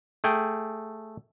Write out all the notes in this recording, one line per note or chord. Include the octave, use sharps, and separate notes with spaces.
A3 G#4 G5